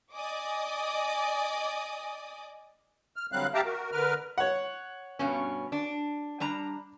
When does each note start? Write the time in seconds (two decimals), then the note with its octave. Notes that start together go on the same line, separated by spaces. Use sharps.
0.15 D5 D#5 G#5 D6 D#6
3.16 F6
3.32 D3 F#3 G3 C4 F5 F#6
3.54 G4 E5 F5 G5 A5 A#5
3.66 F#4 A#4
3.92 D3 A#4 B4 F6
4.38 C#5 F#5
5.19 G2 B2 C#4
5.72 D4
6.40 G3 D4 A#5